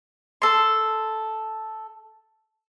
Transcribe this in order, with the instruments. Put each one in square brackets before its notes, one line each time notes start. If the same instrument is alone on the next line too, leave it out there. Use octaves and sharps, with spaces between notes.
[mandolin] A4 C6